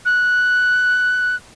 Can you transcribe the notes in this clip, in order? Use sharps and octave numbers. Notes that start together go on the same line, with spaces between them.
F#6